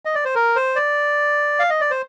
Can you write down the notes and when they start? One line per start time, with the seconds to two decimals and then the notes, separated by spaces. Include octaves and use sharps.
0.05 D#5
0.15 D5
0.25 C5
0.35 A#4
0.56 C5
0.76 D5
1.59 F5
1.70 D#5
1.81 D5
1.91 C5